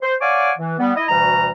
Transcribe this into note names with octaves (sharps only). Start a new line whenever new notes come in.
C5
C#5 D5 F5 F#5 G#5 D6
E3
G3 B3
E4 D#5
D2 B2 E3 G3 A#5